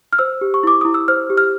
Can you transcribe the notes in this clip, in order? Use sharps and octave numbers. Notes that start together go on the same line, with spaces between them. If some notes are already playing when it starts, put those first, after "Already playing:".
F6
C5 E6
G4
C#6
E4 D6
E4 D#6
E6
C5 F6
G4
F6